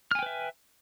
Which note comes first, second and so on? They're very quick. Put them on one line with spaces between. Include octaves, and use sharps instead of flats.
F6 G#5 G5 B4 E5